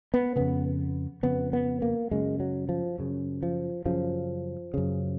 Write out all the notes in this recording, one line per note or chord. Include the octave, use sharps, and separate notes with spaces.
B3
F2 C#3 B3
F2 C#3 B3
B3
A#3
F#2 C#3 G#3
F#3
F3
F#2 C#3
F3
F#2 C#3 F3
F#2 C#3